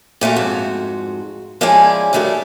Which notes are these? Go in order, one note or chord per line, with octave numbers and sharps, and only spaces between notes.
A#2 A3 F4 F#4
F2 G#2 F#4
F3 G#3 C#4 E4 D5 G#5
D#3 F#3 G3 A3 D4 A4